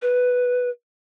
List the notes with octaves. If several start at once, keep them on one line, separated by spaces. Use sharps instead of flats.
B4